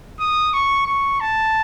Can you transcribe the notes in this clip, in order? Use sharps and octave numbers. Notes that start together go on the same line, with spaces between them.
D#6
C#6
C#6
A5